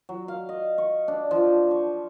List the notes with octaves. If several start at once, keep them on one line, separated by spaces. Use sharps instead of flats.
F#3
F5
D#5
C#6
D4
F3
C#6